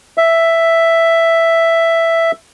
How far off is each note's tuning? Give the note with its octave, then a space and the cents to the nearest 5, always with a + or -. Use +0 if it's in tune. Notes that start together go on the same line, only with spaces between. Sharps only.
E5 +5